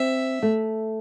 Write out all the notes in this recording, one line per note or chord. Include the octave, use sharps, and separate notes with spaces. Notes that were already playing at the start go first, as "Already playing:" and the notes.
Already playing: C4 E5
A3